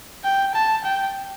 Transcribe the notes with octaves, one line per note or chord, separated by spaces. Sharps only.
G5
A5
G5